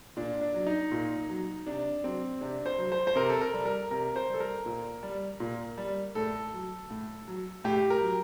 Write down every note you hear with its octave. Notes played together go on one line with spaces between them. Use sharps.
A#2 D4
D4
F#3
D#4
A#2
F#3
C3 D4
F#3 C4
C3 D4
C5
F#3
C5
C5
C3 A#4
A4
A#4
G3
A#4
C3 A#4
C5
G3
A4
A#4
A#2
G3
A#2
G3
A2 A4
F#3
A2
F#3
A2 G4
A#4
F#3